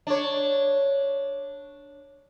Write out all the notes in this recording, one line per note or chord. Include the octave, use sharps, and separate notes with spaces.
D4 C#5